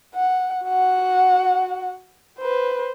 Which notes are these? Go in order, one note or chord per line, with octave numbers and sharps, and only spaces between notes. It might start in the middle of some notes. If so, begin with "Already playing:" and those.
F#5
F#4 F#5
B4 C5